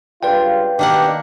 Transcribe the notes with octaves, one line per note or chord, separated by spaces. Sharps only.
C#2 G2 F4 B4 D5 G5
B2 D#3 A#3 D4 G4 F#5